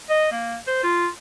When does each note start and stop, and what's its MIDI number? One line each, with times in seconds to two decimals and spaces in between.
0.09 0.28 75
0.31 0.56 58
0.67 0.80 72
0.83 1.07 65